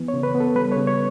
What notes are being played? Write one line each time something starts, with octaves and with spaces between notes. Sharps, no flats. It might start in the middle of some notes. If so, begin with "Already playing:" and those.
Already playing: E3 B3
C#5
C#3
B4
B3
A4
G3 B4
C#5
C#3
C#5